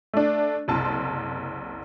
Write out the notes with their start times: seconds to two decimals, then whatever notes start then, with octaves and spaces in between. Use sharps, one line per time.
0.14 A3 D4
0.68 F#1 C2 A5 C6